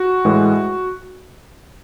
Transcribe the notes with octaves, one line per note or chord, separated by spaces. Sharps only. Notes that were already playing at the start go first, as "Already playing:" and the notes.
Already playing: F#4
A2 E3 G#3